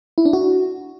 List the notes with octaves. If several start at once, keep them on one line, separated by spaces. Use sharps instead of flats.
E4
D4
F#4